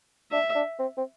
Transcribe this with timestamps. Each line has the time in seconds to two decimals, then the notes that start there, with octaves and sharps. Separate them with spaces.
0.32 D4 E5
0.55 D4
0.79 C4
0.97 C4